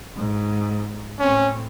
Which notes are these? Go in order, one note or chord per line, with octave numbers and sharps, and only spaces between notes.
G#2
A2 C4 C#4